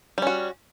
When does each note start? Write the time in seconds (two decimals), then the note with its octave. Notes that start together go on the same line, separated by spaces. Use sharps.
0.18 G3
0.22 C#4
0.27 F#4